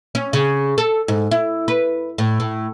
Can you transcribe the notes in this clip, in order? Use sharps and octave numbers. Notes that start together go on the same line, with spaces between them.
C#4
C#3
A4
G#2
E4
B4
A2
A2